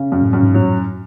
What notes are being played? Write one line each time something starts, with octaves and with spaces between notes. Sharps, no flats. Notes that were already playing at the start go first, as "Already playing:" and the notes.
Already playing: C#3
F#2
A2
F#2
G#2
A2 F#3